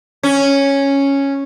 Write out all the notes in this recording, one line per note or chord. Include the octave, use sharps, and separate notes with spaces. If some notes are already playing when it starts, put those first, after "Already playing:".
C#4